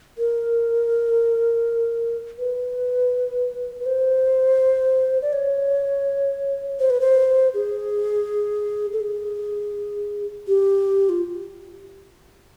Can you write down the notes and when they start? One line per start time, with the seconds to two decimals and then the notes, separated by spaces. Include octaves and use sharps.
0.18 A#4
2.38 B4
3.80 B4
3.86 C5
5.22 D5
5.33 C#5
6.80 C5
6.90 B4
7.01 C5
7.54 G#4
8.93 A4
9.01 G#4
10.48 G4
11.09 F4